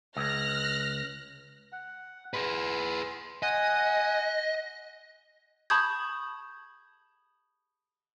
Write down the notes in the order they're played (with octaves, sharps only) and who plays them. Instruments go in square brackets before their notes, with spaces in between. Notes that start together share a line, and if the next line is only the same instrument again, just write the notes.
[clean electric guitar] C#2 [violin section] F6 F#6 A#6
[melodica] F#5
[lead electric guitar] G#4 B4 [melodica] C6
[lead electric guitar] D#5 [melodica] F#5 G#5
[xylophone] A5 B5 C#6 D#6 G6 G#6